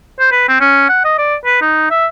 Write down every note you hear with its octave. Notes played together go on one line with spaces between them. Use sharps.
C5
B4
C4
C#4
F#5
D#5
D5
B4
D#4
E5